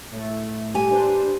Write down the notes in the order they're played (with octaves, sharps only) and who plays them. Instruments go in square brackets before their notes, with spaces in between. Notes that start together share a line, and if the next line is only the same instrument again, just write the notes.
[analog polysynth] A2 A3
[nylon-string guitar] G4 G#5
[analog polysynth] D4 B4 C5